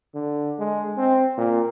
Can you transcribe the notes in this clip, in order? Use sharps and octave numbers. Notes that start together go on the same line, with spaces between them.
D3
G#3
C4
A#2